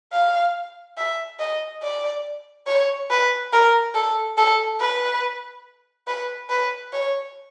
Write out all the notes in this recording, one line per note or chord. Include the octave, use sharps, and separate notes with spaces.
F5
E5
D#5
D5
C#5
B4
A#4
A4
A4
B4
B4
B4
C#5